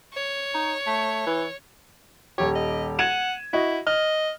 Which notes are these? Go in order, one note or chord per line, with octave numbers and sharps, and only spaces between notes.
C#5
D#4
A3
E3
D#1 G4 C#5
D#5
F#5 G#6 D#7 E7
E4 F#4 D#5
D#5 F6